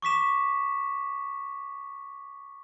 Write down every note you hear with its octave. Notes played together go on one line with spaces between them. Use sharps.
C#6 D6 B6 E7